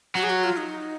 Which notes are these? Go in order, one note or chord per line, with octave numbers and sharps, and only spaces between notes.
F#3 F#4
G#4
F#4
F4
D#4